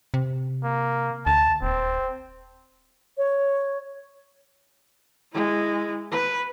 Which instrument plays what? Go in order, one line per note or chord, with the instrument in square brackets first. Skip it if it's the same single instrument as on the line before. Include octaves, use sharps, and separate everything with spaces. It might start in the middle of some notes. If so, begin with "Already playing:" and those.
[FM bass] C3
[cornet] A#3
[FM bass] D2 [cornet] A5
[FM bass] D#1 [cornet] C4
[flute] C#5
[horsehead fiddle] G#3 E4
B4